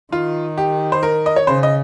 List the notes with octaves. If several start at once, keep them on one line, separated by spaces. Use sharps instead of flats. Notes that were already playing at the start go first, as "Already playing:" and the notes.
D#3 F4
G4
C5
A#4
D#5
C#5
C#3 C5
D#5